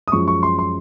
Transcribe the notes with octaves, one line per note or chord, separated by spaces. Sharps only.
D#6
F#2 F3 G#3 C#6
C#6
C6
C6